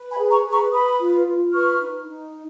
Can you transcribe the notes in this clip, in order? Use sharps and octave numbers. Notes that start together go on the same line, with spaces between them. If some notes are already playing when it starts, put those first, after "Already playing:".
Already playing: B4
G#5 B5
G#4
A#5 C#6
B4
A#5 C#6
B4 B5 D#6
F4
F4
B4 C#6 F6
D#4
D#4